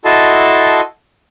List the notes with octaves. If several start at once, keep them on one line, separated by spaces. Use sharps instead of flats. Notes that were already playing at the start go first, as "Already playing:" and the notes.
E4 F#4 A4 D#5 A5 C6